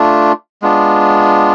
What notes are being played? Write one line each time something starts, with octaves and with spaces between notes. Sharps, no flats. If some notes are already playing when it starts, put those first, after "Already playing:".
Already playing: A3 D4 F4
G#3 B3 D4 F4